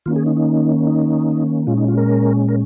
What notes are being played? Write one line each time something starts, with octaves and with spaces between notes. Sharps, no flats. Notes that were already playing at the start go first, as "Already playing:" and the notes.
D#3 A#3 C#4 F4
G#4
D#4
D#4
D#4
A#2 G#3 C#4 F4
D#4
F4
A#4
A#4